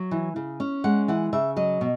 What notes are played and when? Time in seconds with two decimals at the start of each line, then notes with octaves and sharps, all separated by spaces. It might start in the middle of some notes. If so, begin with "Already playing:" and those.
Already playing: F#3
0.11 E3
0.36 C#3
0.60 C#4
0.84 G#3 F#5
1.08 E3 F#5
1.33 C#3 E5
1.56 F#3 D#5
1.81 B2